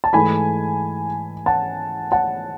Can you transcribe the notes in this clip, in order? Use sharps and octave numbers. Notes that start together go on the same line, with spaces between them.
A5
G#2 E3 A3 G#5 B5
F#5 A5
F#5 A5